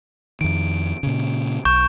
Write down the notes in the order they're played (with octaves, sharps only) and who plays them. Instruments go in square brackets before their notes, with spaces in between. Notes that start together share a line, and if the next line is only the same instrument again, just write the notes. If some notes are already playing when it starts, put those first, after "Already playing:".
[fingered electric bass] F2 D#3 [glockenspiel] D7
[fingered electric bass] A#2 C#3
[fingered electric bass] B1 [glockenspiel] C#6 G6 E7